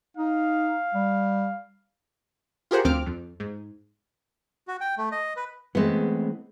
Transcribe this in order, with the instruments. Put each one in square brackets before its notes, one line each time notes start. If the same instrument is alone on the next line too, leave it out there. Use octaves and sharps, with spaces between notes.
[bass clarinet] D#4 [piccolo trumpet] F5
[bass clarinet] G3
[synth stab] F4 G4 G#4 A#4 C5 F#5
D2 F3 C4 D6 F6
F2
G#2
[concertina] F#4
G5
A3
D#5
B4
[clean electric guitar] E3 A3 C4 [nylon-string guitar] G#3 B3